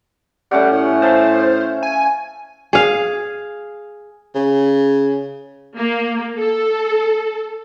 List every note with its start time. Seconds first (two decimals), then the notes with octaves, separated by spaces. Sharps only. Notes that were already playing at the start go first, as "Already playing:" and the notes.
0.51 G3 A3 C#4 F#5
0.71 A2
1.02 C5 E5 F5 A5
1.83 G#5
2.73 G#4 F5
4.35 C#3
5.76 A#3
6.39 A4